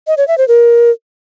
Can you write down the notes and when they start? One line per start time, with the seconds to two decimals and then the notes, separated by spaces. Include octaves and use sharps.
0.07 D#5
0.17 C#5
0.28 E5
0.38 C5
0.48 A#4